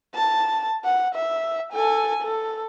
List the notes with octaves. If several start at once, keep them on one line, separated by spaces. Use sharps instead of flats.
A5
F#5
E5
A4 G#5
A4